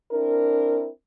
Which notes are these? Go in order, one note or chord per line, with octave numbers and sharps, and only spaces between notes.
C4 D4 E4 A#4